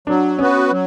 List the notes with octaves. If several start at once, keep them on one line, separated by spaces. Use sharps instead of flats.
F#3 D4
B3 C#4 F#4 B4
F#3